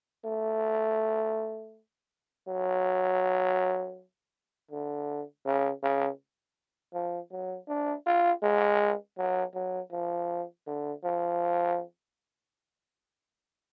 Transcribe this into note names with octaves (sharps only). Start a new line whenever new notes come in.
A3
F#3
D3
C#3
C#3
F3
F#3
D4
F4
G#3
F#3
F#3
F3
D3
F3